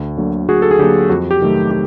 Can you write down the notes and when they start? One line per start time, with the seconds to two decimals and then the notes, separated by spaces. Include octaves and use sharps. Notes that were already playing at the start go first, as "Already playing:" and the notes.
Already playing: D2
0.18 D3 F#3 A#3
0.48 D2 F#4 G#4
0.62 A4
0.71 G#4
0.79 D3 F#3 A#3 G4
1.09 F2 F#4
1.31 G4
1.40 C3 D#3 F#3 A3
1.71 G4